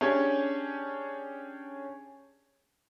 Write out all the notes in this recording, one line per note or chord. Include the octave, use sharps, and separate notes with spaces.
C#4 D4 G4 G#4 C#5